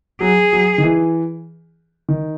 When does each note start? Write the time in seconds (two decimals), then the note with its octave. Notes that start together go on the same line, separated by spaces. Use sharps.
0.21 F#3 G#4
0.53 F#3
0.78 D#3
0.84 E3
2.09 D#3